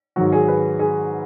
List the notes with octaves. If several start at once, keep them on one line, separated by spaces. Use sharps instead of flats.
G#2 D#3 F#3 F#4
G#4
B4
G#4